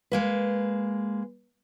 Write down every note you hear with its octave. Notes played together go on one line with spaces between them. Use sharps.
G#3 A#3 B4